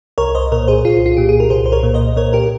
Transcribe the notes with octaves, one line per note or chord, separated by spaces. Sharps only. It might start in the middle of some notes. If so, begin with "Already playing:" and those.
C2 A#4 C#5
C5 D#5
A#2 A#4 C#5
G#4 C5
C2 F4 G#4
F4
A#2 G4
G#4
A#4
C2 G#4 C5
C5
A#4 C#5
A#2
C5 D#5
A#2 A#4 C#5
G4 A#4